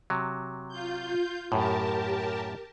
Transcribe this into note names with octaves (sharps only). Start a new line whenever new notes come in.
C3 F#3
F4 G6
F#2 A2 G4 A#4 A5